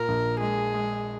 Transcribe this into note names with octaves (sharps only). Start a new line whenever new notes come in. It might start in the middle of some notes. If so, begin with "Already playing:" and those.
Already playing: A#2 A#4
A#1
G#3 G#4
G#3